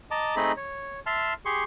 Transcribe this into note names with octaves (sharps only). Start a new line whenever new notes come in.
D#5 A5 A#5 D6
A3 C4 D#4 G#4 D#5 B5
C#5
E5 A5 C6 F6
G4 G#4 C6 C#6